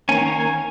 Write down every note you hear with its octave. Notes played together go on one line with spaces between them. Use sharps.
D#3 A#3 C#4 G#5
A#5
G#5